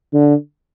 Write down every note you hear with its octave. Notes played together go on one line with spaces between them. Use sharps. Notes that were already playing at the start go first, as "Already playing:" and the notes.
D3